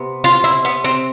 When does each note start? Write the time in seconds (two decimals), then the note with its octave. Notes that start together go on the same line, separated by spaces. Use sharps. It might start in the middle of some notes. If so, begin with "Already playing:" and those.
Already playing: C3 B3
0.24 F4
0.44 E4
0.65 B3
0.84 C4